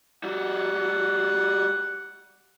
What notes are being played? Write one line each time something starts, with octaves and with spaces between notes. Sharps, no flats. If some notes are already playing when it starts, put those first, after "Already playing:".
G3 F#4 F#5